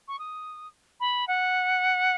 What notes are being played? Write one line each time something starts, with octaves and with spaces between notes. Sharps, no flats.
C#6
D#6
B5
F#5